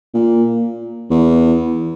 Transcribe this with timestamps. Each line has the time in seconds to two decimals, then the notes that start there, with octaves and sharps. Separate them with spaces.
0.14 A#2
1.10 E2